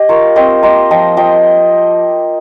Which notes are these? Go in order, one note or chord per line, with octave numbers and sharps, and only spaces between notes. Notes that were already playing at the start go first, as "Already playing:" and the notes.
Already playing: G4 D#5
F4 A#4 C#5
C4 C5 D#5
A#3 C5 D#5
F3 D#5 G5
F3 D#5 G5